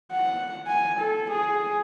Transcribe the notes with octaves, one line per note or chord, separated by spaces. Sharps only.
F#5
G#5
A4
G#4